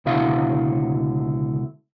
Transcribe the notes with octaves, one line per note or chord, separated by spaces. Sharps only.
C#2 B2 D3 E4 F#4 F5